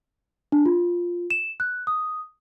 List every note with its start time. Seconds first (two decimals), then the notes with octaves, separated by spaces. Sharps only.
0.52 D4
0.66 F4
1.30 E7
1.60 F#6
1.87 D#6